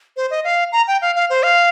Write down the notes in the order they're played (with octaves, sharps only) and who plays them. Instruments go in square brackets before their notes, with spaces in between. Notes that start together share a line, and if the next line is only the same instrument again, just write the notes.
[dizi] C5
D#5
F5
A#5
G5
F5
F5
C5
F5